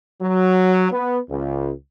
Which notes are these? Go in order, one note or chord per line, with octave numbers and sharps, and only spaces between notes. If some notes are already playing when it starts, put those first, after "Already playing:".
F#3
B3
C#2